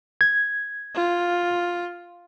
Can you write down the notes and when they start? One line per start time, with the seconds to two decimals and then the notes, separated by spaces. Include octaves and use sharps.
0.21 G#6
0.95 F4